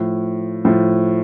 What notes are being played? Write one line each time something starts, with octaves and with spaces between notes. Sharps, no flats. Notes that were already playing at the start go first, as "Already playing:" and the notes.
Already playing: A2 F3
A2 F3